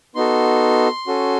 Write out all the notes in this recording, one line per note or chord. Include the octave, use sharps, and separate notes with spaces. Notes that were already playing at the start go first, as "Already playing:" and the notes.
B3 D#4 F#4 A4 C6
C#4 F#4 A4